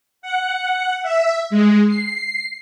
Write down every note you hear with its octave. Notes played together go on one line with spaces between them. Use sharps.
F#5
E5
G#3
C7